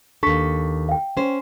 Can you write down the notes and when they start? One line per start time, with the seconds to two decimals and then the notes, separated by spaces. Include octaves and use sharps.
0.23 D#2 D4 A4 C#6 B6
0.89 F5 G5
1.17 C#4 C5